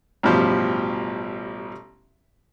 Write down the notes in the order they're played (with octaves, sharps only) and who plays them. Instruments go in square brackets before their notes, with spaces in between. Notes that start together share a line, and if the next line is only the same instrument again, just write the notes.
[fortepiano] A1 G2 B2 F3 G4